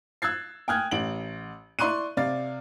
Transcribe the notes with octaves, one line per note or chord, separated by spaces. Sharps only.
E6 F#6 G#6 A6 C7
G5 G#5 D#6 F6 F#6 G#6
A1 D7 F#7
E4 D5 C6 C#6 F#6 D#7
C3 D5 F5 A6